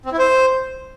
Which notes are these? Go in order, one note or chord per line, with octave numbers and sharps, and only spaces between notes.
C4
E4
C5